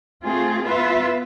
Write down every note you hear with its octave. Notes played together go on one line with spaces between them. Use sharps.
A3 C4 F4 G#4
B3 F4 B4 E5